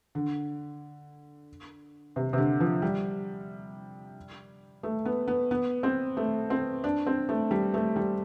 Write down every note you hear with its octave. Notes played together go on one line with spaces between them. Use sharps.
D3
C3
C3
D3
F3
G3
A3
B3
B3
B3
C4
A3
C4
D4
C4
A3
G3
A3
G3